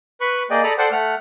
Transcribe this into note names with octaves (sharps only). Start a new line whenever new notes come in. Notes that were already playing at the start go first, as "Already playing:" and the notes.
B4 B5 C#6
A#3 G#4 D5 D#5 G5
A4 D5 A#5 B5 D#6
A4 C5 D5 F#5 G5
A3 F#5 F6